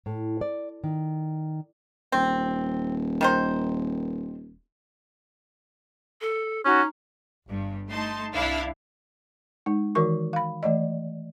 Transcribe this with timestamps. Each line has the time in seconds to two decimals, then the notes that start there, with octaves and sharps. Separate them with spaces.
0.06 A2
0.41 D5
0.84 D#3
2.12 D#1 C4
3.21 D#3 D#4 C5
6.21 A4
6.65 C#4 D#4 F#4
7.49 G1 G2
7.90 A3 D#4 A5 C6
8.34 C2 D4 E4 F5
9.66 G#3 D#4
9.95 D#3 E3 F#4 A#4 C#6
10.33 F5 B5
10.63 E3 A3 D5 D#5